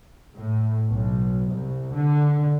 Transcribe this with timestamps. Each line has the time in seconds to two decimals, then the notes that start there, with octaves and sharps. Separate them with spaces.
0.36 A2
0.90 B1
1.51 C2
1.94 D3